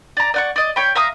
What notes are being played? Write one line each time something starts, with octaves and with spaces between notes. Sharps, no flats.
D5 A#5
D5 F#5 C#6
D5 D#5
C#5 G5 B5
E5 F5 A#5 D#6